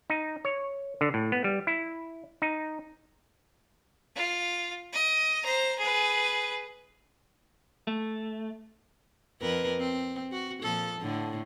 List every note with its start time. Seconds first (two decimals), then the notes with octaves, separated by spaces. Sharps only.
0.10 D#4
0.45 C#5
1.01 D3
1.14 A2
1.32 B3
1.44 G3
1.67 E4
2.42 D#4
4.16 F4
4.93 D#5
5.43 C5 A#5
5.79 G#4 B4
7.87 A3
9.41 F2 A#4 B4
9.80 C4
10.32 F#4
10.62 A#2 F3 A4
11.00 A2 D3